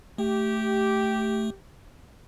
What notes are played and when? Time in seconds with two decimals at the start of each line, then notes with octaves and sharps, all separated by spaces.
0.18 A3 G4